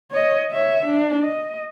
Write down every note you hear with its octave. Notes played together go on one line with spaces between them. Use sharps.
C#5 D#5
C#5 E5
D4
D#5